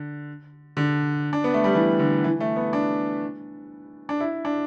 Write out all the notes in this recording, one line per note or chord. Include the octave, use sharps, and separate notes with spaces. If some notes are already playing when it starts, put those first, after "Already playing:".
Already playing: D3
D3
D4
B3
A3
G3
E3
D3
E3
A3
B3
D4
D4
E4
D4